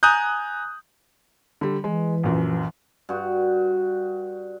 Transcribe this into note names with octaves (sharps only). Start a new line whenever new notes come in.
G#5 A#5 D#6 F#6 G6
D3 G3
E3 G#3
A#1 F#2
G2 F#4